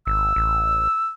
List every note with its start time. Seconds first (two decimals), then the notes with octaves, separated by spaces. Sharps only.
0.07 G#1 E6
0.36 A1